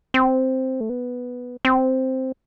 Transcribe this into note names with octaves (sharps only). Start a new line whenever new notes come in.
C4
A3
B3
C4